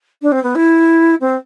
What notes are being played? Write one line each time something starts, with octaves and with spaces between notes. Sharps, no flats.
D4
C4
B3
E4
C4